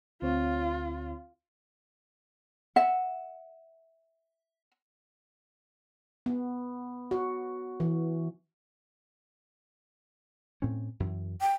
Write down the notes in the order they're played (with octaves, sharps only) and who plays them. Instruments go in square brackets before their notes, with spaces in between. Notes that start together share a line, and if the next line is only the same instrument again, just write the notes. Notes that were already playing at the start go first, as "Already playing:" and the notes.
[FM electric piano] D2 C4 C#5 [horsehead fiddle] F4
[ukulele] E5 F#5
[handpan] B3
F#4
E3
[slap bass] A2 C4 C#4
F#2 E3
[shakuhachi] G5